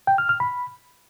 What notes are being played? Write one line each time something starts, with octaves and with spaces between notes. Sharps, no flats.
G5
F6
F6
B5